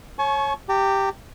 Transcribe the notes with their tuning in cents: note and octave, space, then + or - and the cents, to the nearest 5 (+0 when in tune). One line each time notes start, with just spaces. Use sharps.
C#5 -15 G#5 +45 C#6 +0
G4 +0 A#5 -40